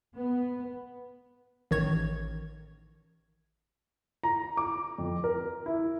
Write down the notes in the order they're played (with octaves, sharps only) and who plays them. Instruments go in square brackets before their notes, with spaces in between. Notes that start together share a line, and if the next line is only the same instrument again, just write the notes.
[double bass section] B3
[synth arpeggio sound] A1 D#3 C#5 G#6
[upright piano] A#5
D6
F2
A#4
E4